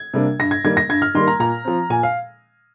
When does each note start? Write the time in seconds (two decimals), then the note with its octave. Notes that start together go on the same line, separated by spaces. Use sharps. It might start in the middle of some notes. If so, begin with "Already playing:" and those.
Already playing: G#6
0.14 C3 G3 A#3 D4
0.39 G2 A#6
0.51 G#6
0.64 D#3 G3 A#3 G#6
0.77 A#6
0.89 G2 G#6
1.02 F6
1.15 D#3 G3 A#3 C6
1.28 A#5
1.40 A#2 A#5
1.65 F3 C4
1.90 A#2 G#5
2.03 F5